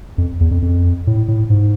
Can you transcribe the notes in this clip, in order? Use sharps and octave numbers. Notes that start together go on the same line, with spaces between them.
F2
E2
F2
F2
A2
A2
G#2